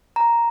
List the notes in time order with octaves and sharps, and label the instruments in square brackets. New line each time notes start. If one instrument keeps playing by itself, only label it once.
[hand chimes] A#5